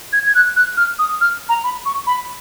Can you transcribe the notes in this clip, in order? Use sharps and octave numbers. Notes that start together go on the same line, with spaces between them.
G#6
G#6
F#6
F#6
F6
D#6
F6
A#5
B5
C#6
B5